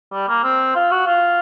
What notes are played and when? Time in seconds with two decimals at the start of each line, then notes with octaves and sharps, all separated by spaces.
0.12 G3
0.28 A#3
0.43 C4
0.75 F4
0.91 F#4
1.07 F4